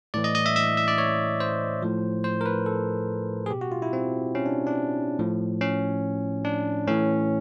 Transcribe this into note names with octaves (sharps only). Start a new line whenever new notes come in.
A2 E3 D5
D#5
D#5
E5
E5
E5
D5
C#5
C5
A2 F3
C5
A#4
B4
A4
G#4
B2 G4
F#4
F4
E4
C4
C#4
D4
D4
A2 F3
C#4
D4
A2 E3 C#4